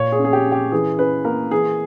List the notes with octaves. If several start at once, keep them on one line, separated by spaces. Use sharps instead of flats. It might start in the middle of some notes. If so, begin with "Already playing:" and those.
Already playing: A#2 C#5
G#4
C#4
G#4
G4
C#4
G4
E3 G#4
C#4 B4
A#3 A#4
E3 G#4